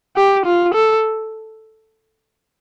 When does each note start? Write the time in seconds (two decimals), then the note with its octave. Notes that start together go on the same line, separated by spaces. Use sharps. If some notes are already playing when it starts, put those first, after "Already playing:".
0.16 G4
0.46 F4
0.75 A4